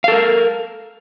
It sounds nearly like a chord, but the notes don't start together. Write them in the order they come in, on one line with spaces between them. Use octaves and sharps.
F5 A4 A#4